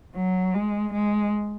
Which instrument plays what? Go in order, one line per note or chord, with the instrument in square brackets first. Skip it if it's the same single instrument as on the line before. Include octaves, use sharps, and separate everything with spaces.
[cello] F#3
G#3
G#3